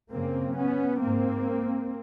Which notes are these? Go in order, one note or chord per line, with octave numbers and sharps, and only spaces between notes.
F#2 C#3 A#3 C4
B3 C#4
G#2 A#3 C4